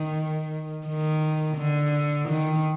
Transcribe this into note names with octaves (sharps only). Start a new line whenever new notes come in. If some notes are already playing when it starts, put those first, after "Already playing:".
Already playing: D#3
D#3
D3
D#3